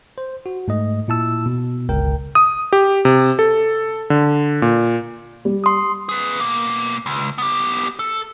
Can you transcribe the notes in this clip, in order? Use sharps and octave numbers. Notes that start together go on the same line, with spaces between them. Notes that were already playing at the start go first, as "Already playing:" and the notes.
C5
F#4
G#2 A3 D#5
A#2 E4 A5 E6
B2
G1 C#2 A#4 G5
D#6
G4
C3
A4
D3
A#2
G3
C6 D#6
G#4 B4
B2 A#3
C#2
B3 G4
A4